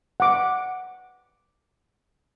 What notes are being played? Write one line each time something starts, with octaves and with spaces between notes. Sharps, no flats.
F#5 D6